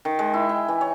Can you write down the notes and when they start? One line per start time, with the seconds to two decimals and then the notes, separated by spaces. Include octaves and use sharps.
0.05 D#3
0.19 G#3
0.34 E4
0.49 G5
0.69 E3
0.81 C#5